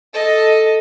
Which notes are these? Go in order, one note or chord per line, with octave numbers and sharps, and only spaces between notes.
A4 D#5